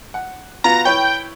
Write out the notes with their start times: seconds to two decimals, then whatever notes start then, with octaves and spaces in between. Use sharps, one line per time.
0.14 F#5
0.64 B3 F4 F#4 A#5
0.85 E4 B4 C#5 G5